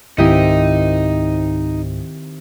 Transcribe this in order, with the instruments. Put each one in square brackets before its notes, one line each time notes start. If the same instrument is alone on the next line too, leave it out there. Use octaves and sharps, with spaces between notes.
[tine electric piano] C#2 G#2 [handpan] D#3 C4 [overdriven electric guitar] D#4 [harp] E4 G4 D#5